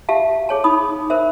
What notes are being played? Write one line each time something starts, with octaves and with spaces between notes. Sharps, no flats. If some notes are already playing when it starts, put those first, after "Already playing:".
G4 E5 F5 A5
G#4 C#5 A5
D#4 B5 D#6
A#4 C5 E5